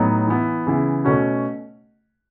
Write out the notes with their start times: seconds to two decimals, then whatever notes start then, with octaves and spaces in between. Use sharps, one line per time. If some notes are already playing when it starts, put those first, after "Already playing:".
Already playing: A2 F#3 B3 D#4
0.27 E3 B3 E4
0.67 C#3 E3 B3 E4
1.05 B2 A3 C#4 F#4